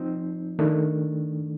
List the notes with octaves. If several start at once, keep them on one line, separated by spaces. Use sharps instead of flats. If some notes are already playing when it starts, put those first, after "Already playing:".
Already playing: F3 C4 D#4
D#3 A3 D4